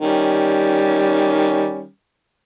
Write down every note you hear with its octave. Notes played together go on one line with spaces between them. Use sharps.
D#3 G3 C#4